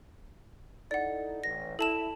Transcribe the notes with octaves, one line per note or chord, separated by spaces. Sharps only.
D#4 E4 A4 D5 F#5
A1 A#6
E4 A4 A5 E7